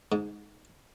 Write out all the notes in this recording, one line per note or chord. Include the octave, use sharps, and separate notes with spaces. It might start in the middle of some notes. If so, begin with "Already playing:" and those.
G#2